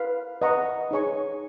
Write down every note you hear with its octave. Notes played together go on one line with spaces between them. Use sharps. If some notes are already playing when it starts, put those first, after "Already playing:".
Already playing: B4 F5 B5
B4 D#5 F#5 A#5 C#6
D#4 G#4 C#5 G#5 C#6